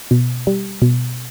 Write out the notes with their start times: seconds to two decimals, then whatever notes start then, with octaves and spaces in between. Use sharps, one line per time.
0.11 B2
0.47 G3
0.82 B2